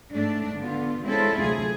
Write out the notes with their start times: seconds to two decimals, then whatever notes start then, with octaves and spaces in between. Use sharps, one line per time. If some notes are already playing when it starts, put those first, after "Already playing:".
0.14 G#2 A3 D4
0.57 D3 B3 F4
1.06 G#3 C4 C#4 E4 F4 A4
1.41 D2 C3 F#3 G#4